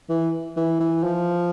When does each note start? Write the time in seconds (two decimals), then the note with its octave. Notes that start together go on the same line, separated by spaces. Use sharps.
0.10 E3
0.57 E3
0.80 E3
1.04 F3